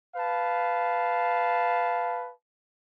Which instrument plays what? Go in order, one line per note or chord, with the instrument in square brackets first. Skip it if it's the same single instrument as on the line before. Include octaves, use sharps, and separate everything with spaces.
[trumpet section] B4 F5 A5